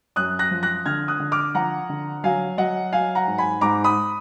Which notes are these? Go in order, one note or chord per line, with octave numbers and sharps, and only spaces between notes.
F#2 D#6 F#6
F#6 A#6
F3
F#6 A#6
D3 F6 G#6
D#6 F#6
D3
D6 F6
F3 F#5 A#5
D3
F#3 F5 G#5
F#3 D#5 F#5
F#3 F5 G#5
F#5 A#5
G#2
G#5 B5
G#2 A#5 D6
B5 D#6